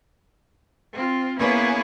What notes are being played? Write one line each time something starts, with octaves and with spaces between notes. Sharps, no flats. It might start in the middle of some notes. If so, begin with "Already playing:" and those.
C4 F4
A#3 B3 C#4 E4 G#4 B4